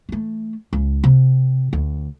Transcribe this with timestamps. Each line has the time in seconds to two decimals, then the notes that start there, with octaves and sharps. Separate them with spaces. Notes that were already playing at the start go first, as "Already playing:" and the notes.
0.09 E3 A3
0.73 C#2
1.04 C3
1.73 D2